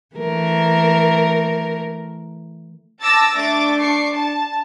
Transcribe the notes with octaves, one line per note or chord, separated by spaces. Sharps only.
E3 A3 A#4
A5 D6 E6 A6 A#6
A3 D4 D6 A6
D4 C#6 D6 C7
A5